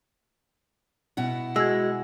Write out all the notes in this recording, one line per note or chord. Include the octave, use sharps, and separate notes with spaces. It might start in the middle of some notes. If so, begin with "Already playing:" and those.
B2 E4 F#5
G#3 F#4 E6 G#6